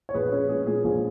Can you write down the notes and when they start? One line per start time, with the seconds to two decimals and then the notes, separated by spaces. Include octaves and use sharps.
0.09 C#5
0.14 A#1 G#4 B4
0.32 C#4 G#4
0.49 G#3 G#4
0.67 A#2 G#4
0.84 A#1 G#4